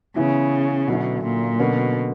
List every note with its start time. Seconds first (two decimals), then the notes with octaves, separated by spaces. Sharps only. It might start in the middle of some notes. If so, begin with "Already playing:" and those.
0.16 C#3 E3 B3 E4
0.88 B2 D3 F#3 C#4 E4
1.24 A#2
1.59 B2 D3 F#3 A#3 C#4